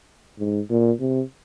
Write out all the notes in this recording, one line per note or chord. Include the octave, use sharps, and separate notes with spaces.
G#2
A#2
C3